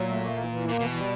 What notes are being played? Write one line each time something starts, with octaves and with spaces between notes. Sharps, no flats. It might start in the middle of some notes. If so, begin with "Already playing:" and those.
Already playing: A#2 F#3
A3
A#3
E3
E3
A#2 A#3
B2 E3
G3